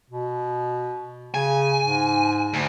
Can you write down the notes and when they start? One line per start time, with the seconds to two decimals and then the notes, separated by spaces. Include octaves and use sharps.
0.10 B2
1.34 C#3 G#5
1.81 G#2
2.54 D2